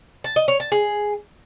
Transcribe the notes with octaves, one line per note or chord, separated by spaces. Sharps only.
A5
D#5
C#5
A5
G#4